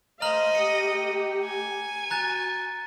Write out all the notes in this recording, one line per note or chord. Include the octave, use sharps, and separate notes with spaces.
A3 C5 D#5 F5 A#5 F6 F#7
A3 G4 G5 C#7
G#5
F#4 A#5 F#6 A6